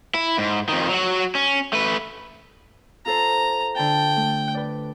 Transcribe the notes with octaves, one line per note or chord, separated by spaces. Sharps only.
E4
G#2
F2 D#3
F#3 F#4
C#4
A3 B4
F4 A4 C5 A#5
D3 G5 A5
A3
B4 D5